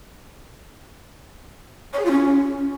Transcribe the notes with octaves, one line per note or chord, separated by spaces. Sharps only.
C#5
G#4
F4
C#4